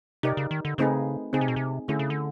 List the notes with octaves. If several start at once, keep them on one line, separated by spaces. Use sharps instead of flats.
C3 D#4 G4 A#4 D5
C#3
D#3
D3
C#3 A3 C4 D#4 G#4 B4
C#3 C4 D#4 G#4
C3
B2
C3
D3 A3 C#4 E4 G#4
C#3
D3